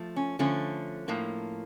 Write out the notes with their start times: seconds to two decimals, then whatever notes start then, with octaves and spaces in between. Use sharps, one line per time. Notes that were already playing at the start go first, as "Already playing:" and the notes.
Already playing: F3 A3
0.16 C#4
0.39 D3 F3 A3 C#4
1.08 A2 F3 A#3